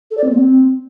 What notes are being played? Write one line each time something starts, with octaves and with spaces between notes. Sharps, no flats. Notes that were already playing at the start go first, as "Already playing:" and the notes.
A4
D5
C4
A#3
C4